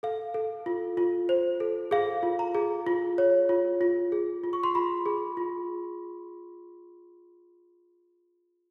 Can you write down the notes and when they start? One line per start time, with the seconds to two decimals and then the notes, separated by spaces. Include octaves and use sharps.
0.03 A4 F5
0.34 A4
0.66 F4
0.97 F4
1.29 C5
1.60 A4
1.91 G#4 F5
2.23 F4
2.39 A#5
2.55 G#4
2.87 F4
3.18 C#5
3.49 F4
3.81 F4
4.12 G#4
4.44 F4
4.53 C#6
4.63 C6
4.75 F4 B5
5.06 G#4
5.37 F4